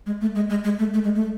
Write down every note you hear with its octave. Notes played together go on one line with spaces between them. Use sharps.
G#3
A3
G#3
G#3
G#3
A3
A3
G#3
A3